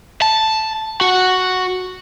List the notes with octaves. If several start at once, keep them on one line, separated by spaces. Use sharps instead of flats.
A5
F#4